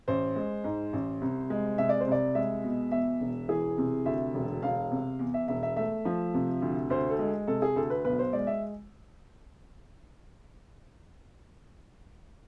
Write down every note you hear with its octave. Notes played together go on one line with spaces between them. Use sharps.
A1 C5
G#3
G#2
A1
C2
G#3
C3 E5
D5
C5
C2 D5
G#3 E5
B2
E2 E5
E1
E3 G#4
C3
D2 E5
E1
E1 F5
C3
E2
E5
E1 E5
E5
A3 E5
F3
C3
D2
D2 C5
A4
G#3
C3 A4
G#4
D2 A4
B4
B1 B4
C5
G#3 D5
E5